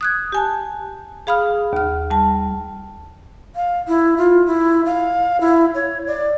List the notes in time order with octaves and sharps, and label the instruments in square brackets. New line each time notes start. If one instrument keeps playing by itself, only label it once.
[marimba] D#6 F#6 G#6
G4 G#5 A5
G#4 F5 B5 D#6 F6
D#2 F6
G3 A5
[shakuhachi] F5
E4
F4
E4
F5
E4
C#5
D5